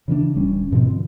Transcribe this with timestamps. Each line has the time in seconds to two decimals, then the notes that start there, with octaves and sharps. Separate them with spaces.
0.08 C#3 E3 G3 D4
0.36 D1 G3 C#4
0.71 G#2 B2 F3 C4
0.90 D3